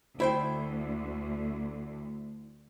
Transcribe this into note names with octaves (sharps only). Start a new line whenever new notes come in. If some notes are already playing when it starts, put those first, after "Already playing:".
D2 E4 C5 G5